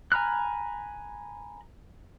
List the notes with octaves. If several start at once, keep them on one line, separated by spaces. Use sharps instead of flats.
G#5 A#5 B5 F6 F#6